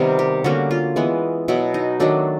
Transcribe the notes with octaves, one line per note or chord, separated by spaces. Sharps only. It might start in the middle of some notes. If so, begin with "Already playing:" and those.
Already playing: C3 D#3 G3 B3 A#4
G4
D3 G3 A#3 C#4 F#4
F4
E3 G#3 B3
B2 F#3 B3 E4
D#4
D#3 F#3 A3 D4